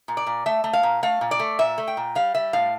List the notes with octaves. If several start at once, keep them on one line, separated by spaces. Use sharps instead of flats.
A#2
D5
A#2
A3 E5
A3
F5
A#2
A3 F5
A#2
D5
A3
A#2 E5
A3
G5
A#2
G3 F5
G3 E5
A2 F5